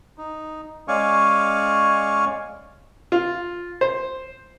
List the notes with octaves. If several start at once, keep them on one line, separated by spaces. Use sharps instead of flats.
D#4
G#3 C#4 D5 F5 G#5 C#6
F4
C5